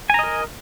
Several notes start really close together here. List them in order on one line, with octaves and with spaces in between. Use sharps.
G#5 A#5 D#5 A#4